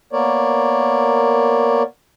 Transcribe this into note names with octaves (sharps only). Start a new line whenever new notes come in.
A#3 B3 A#4 C#5 D5